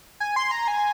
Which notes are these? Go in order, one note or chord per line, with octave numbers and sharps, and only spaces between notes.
G#5
C6
A#5
G#5